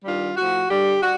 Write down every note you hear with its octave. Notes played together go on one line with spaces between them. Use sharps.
G2 D#3 G3 F4
A2 F3 F#4
G2 D3 G3 G4
G3 F#4